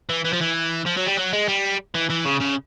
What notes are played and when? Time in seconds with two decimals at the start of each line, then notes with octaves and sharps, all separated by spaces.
0.09 E3
0.25 E3
0.33 F3
0.41 E3
0.86 F3
0.97 F#3
1.07 G3
1.17 F#3
1.33 G#3
1.48 G3
1.95 E3
2.10 E3
2.26 C#3
2.41 C#3